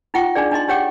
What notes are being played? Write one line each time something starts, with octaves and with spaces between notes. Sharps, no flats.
D#4 F4 F#5 G5 C#6
D4 D#4 G#4 D5
D4 D#4 D#5 C6
D4 G4 C#5 F#5 G5 D6